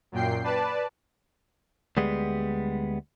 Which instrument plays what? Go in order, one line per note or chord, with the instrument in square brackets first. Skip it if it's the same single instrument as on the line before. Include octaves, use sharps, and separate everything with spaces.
[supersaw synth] F#2 A#2 G5 C7
B4 D5 A5
[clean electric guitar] D2 G3 G#3 B3